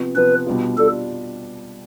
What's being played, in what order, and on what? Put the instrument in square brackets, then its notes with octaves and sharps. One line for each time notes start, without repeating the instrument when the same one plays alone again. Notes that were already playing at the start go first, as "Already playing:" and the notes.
Already playing: [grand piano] C3 F3 B3 F4
[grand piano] C3 F3 B3 F4 [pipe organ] B4
[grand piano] B2 G3 D4 F4
[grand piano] B2 G3 D4 F4 [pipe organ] A4